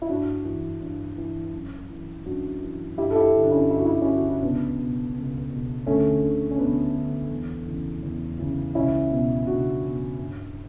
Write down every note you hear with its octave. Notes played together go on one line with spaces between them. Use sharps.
E4
G2 D4 F#4
E3
G2
E3
F#2
E3
F#2 D4 F#4
E3
G2 E4 G4
A4
E4 G4
D3
D4
C#4 E4
G2 E4
F#4
E4
F#4
D3 C#4 E4
F#4
E4
C#2 B3 D4
B2
C#2
B2
D2 A3 C#4
D3
C#4
D2 B3 D4
D3
E2
C#3 E3
E2
C#3 E3
C#2 C#4 E4
B2
C#2 D4 F#4
B2
G2